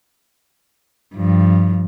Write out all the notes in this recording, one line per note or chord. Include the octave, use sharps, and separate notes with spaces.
G2 F3